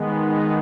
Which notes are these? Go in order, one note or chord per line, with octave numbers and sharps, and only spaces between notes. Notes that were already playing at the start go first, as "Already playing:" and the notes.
Already playing: D#3 G#3 B3
D#4